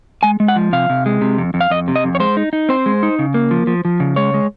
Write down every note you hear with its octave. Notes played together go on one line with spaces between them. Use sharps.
G#3 G#5
G#3
F#5
F3
C3 F5
C3
G#3
C3
F2
F2
F5
F2 D#5
C3
D#5
F2
C#5
G#3 C5
D#4
D#4
C4 C5
G#3
D#4
C#3
A#3
F3
F3
F3
C#3
G#3 C#5
G#3